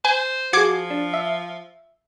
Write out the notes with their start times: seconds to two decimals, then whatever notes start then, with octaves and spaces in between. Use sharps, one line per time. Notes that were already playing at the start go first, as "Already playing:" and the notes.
0.05 C5 G#5
0.53 F3 F#4 G#4 D6 G#6 C7
0.90 D4
1.13 E5